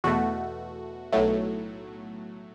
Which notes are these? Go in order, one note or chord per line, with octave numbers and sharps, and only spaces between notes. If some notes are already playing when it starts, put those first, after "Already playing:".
E2 B2 A3 F#4
B1 A2 F#3 A3